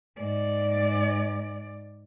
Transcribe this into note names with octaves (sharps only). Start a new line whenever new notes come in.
G#2 D5